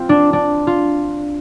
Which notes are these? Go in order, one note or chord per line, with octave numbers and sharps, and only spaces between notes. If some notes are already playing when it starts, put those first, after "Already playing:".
Already playing: C4 F4
D4
D4
F4